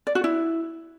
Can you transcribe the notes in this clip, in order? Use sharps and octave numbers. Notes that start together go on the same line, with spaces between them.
D5
F#4
E4